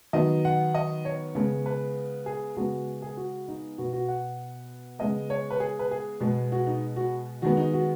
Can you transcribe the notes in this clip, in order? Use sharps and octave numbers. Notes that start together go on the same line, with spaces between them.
D#3 F#3 B3 D#5
F#5
D#5
C#5
C#3 G#3 B3
B4
G#4
C#3 G#3 B3 F#4
G#4
F#4
D#4
B2 B3 F#4
F#4
F#5
C#3 G#3 B3 D#5
C#5
B4
G#4
B4
G#4
B2 G#3 B3
F#4
D#4
F#4
D#3 G#3 B3 F#4
D#4
F#4